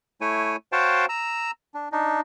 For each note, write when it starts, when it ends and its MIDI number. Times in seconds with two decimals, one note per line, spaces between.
0.21 0.56 57
0.21 0.56 64
0.21 0.56 73
0.21 0.56 80
0.72 1.06 66
0.72 1.06 72
0.72 1.06 73
0.72 1.06 77
0.72 1.06 79
0.72 1.06 81
1.09 1.51 82
1.09 1.51 88
1.74 1.88 62
1.92 2.21 62
1.92 2.21 63